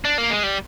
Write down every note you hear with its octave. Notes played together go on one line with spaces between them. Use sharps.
D4
A#3
G#3
G3